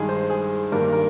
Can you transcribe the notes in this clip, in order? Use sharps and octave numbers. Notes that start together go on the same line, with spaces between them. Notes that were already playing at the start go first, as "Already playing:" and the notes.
Already playing: G2 D#3 G#3 G#4
C5
G#4
G2 D#3 G3 A#3 D4 A#4
A#4